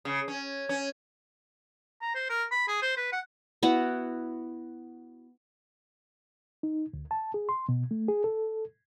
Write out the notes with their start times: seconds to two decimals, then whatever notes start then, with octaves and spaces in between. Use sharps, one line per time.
0.05 C#3
0.28 C#4
0.69 C#4
2.02 A#5
2.15 C5
2.30 A#4
2.51 B5
2.68 G#4
2.82 C5
2.97 B4
3.12 F#5
3.63 B3 E4 F#4 F#5
6.63 D#4
6.93 D2
7.11 A5
7.34 G#4
7.49 C6
7.69 B2
7.91 A3
8.08 G#4
8.24 A4